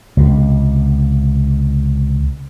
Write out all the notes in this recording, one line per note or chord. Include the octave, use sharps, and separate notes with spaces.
C#2 C3